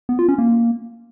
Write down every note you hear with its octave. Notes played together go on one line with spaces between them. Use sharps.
B3
F4
C#4
A#3